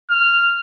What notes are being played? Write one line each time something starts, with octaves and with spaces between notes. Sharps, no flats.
F6